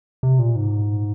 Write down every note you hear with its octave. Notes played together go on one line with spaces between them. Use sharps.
C3
A#2
G#2